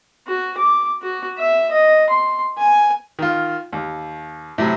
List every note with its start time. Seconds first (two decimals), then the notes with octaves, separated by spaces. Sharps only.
0.28 F#4
0.58 D6
1.02 F#4
1.38 E5
1.71 D#5
2.10 C6
2.58 G#5
3.19 D#3 F4
3.73 D#2
4.58 A2 C3 F#3